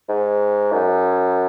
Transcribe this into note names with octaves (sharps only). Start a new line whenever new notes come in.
G#2
F#2